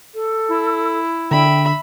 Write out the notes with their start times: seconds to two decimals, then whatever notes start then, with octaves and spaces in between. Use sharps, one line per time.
0.15 A4
0.49 E4
1.31 D3 D4 E5 G5 B5